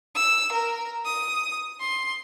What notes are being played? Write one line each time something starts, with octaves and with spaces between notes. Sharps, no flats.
E6
A#4
D#6
C6